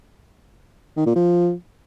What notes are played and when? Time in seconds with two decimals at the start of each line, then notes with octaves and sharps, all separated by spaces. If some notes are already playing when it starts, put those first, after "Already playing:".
0.97 D#3
1.06 A#2
1.15 F3